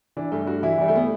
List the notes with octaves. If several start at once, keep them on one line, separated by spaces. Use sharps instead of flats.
E3 D4
G2 A3
G2 F#4
E3 E4
E3 G3
A3
B3